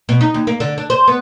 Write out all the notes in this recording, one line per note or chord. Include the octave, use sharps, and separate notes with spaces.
B2
D#4
D#2
A#3
D3
D4
C5
B3